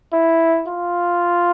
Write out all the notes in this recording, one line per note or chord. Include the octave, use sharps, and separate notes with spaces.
E4
F4